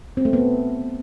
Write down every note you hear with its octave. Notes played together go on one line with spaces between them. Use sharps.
C4
A3
B3